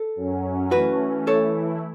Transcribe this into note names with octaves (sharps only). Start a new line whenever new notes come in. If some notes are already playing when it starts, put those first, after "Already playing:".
Already playing: A4
F#2 F#3 C#4
E3 A3 C#4 F#4 B4
E3 A3 E4 A4 C#5